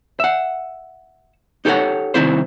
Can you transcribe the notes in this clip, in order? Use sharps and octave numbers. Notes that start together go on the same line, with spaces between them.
E5 F#5
D#4 G4 A4 C5 C#5 F#5
C2 D#3 C4 E4 C5